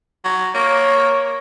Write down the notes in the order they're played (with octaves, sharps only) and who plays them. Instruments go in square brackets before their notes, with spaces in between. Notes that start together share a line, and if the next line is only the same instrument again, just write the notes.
[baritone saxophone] F#3
[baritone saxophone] A#3 [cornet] C#5